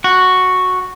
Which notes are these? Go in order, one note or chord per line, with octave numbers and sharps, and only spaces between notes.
F#4